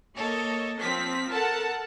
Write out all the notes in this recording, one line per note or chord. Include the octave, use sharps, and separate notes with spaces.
A#3 A4 C#5 D#5
F3 C4 B6
A4 A#4 F#5 A5